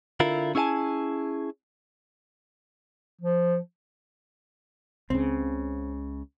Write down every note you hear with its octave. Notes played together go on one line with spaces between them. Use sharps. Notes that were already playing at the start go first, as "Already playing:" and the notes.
D3 E4 F4 A#4
C#4 E4 G#4 E5 G#5 A5
F3
C#2 C#3 C4